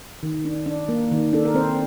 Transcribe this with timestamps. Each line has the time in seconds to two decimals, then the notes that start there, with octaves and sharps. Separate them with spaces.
0.23 D#3
0.45 D4
0.66 D4
0.89 A#3
1.12 D#3
1.33 D4 A4
1.45 A#4
1.55 C4 C5